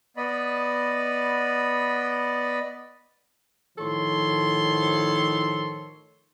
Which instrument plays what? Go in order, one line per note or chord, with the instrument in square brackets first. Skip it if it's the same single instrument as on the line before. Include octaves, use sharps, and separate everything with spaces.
[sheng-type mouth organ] B3 D5 D#5 B5
[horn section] A2 D#3 F3 A4 C#5 C6